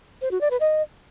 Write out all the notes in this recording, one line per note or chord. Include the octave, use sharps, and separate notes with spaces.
C5
F#4
D5
B4
D#5